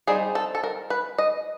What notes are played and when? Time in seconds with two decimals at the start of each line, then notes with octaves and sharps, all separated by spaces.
0.07 G3 C4 D#4 G#4
0.35 A4
0.55 A4
0.63 A#4
0.90 B4
1.18 D#5